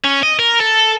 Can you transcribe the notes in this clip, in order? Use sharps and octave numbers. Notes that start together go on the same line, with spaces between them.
C#4
D#5
A#4
A4